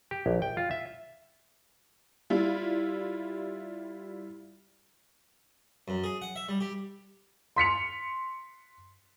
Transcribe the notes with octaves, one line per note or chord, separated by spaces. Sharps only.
G4
A#1
G5
F4
E5
G3 E4 F4
F#2
G#4
F#5
E5
G3
G4
C6 B6 C#7 F7